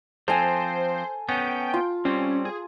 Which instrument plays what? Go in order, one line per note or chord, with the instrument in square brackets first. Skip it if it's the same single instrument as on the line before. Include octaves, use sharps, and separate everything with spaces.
[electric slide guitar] F3 C4 [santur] A4 G#5 [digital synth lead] C5
[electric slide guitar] B3 C#4 [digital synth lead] G5
[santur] F4
[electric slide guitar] G3 C4 [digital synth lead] C#4
[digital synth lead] G#4